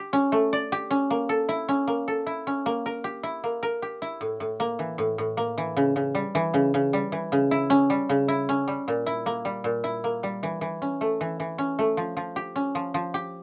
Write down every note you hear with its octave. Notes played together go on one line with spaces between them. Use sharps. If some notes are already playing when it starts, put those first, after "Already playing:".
Already playing: G4
C#4
A3
D5
G4
C#4
A#3
A4
E4
C#4
A#3
A4
E4
C#4
A#3
A#4
G4
E4
A#3
A#4
G4
E4
A2
A2
A#3
E3
A2
A2
A#3
E3
C#3
C#3
G3
E3
C#3
C#3
G3
E3
C#3
E4
C#4
G3
C#3
E4
C#4
G3
A#2
E4
A#3
G3
A#2
E4
A#3
G3
E3
E3
C#4
A3
E3
E3
C#4
A3
F3
F3
G4
C#4
F3
F3
G4